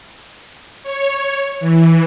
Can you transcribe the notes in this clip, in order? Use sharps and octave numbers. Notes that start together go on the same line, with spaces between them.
C#5
E3